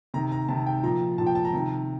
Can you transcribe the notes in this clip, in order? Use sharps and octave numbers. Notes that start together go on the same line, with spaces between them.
C3 D#3 A#5
A#5
C3 D#3 A5
G5
A#2 F3 A#5
A#2 F3 A5
G5
A5
A#5
C3 D#3